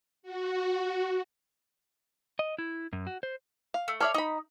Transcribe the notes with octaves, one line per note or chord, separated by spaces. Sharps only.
F#4
D#5
E4
F#2
F#4
C5
F5
A3
A4 C#5 D5 E5 F5 F6
D#4 D#5 B5